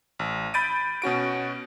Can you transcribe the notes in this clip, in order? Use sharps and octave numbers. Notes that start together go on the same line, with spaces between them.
A1
B5 G6 A6 D7 D#7
B2 C#4 F#4 D7